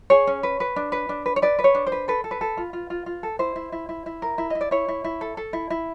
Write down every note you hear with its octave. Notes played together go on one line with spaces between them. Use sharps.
G#4 C#5
C#4
B4
B4
D4
B4
D4
B4
C#5
B4 D5
B4
C#5
D4
C5
B4
A4 B4
A4
B4
A4
F4
F4
F4
F4
A4
E4 C5
E4
E4
E4
E4
A#4
E4
E4 D#5
D5
E4 C#5
E4
E4
A4
A4
E4
E4